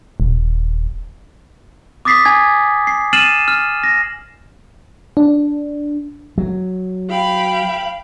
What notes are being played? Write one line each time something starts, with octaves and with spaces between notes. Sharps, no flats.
D#1
D6 D#6 A6 B6 C7
G#5 G#6
C7
F6 A6 C7 D#7 E7 F#7
F6
A#6
D4
F#3
F5 G5 B5